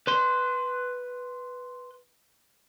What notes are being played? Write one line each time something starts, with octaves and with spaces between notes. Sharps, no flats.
B4 C6